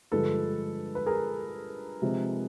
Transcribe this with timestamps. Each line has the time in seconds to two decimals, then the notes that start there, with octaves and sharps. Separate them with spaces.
0.11 G2 D3 F3 G#3 A4 B4
0.95 B4
1.06 G#4 A#4
2.02 C3 F3 G#3 C4